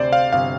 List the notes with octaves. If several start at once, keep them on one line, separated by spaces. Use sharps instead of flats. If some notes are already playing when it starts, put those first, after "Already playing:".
Already playing: D2 C3 C5 D5
F5
G1 C3 F5